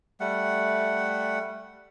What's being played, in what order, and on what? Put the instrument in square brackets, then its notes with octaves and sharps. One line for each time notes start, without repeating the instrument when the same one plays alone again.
[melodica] G3 A3 F#5